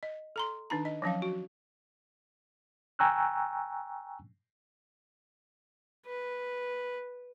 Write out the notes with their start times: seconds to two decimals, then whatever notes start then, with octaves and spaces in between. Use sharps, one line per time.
0.03 D#5
0.36 A4 A#5 C6
0.70 D#3 D4 D#4 A#5
0.85 D#5
1.02 F3 F#3 C#4 F5
1.22 F#4
2.99 G5 G#5 A#5 C#6 E6 F#6
6.06 B4